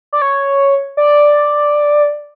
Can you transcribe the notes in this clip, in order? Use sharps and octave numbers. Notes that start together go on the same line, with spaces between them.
D5
C#5
D5